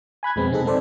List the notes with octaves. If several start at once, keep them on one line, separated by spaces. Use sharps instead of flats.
G#5 B5 F#6 G#6
F2 B2 G#3 B3 C4
C3 C4 D#4 G#4 A4
G#3 C4 A4 C5 D5